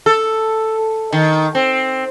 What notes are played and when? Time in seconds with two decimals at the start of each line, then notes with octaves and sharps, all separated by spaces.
0.06 A4
1.13 D#3
1.55 C4